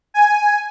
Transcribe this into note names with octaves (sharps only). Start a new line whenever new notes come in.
G#5